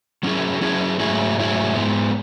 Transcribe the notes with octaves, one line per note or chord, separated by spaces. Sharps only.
F#3 C#4 E4 G#4
F#3 C#4 E4 G#4
G#2 F#3 A3 E4 G#4
G#2 F#3 A3 E4 G#4
G#2 G#3 B3